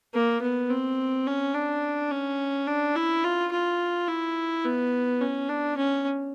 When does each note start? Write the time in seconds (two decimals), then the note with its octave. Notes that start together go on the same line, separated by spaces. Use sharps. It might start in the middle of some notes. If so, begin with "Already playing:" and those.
0.14 A#3
0.42 B3
0.70 C4
1.27 C#4
1.55 D4
2.11 C#4
2.67 D4
2.96 E4
3.24 F4
3.52 F4
4.08 E4
4.65 B3
5.21 C#4
5.49 D4
5.77 C#4